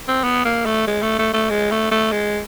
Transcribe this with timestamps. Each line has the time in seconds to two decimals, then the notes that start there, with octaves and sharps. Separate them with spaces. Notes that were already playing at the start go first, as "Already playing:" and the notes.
0.08 C4
0.24 B3
0.45 A#3
0.66 A3
0.88 G#3
1.02 A3
1.19 A3
1.34 A3
1.50 G#3
1.71 A3
1.91 A3
2.12 G#3